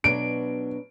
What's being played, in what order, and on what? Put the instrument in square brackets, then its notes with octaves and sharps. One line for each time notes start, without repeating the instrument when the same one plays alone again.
[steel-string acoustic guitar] B2 F#3 D4 [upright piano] D7